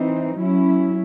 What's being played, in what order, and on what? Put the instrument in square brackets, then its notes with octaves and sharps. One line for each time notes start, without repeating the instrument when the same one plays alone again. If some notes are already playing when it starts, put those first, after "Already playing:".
Already playing: [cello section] E3 C4 D#4
F#3 C#4 E4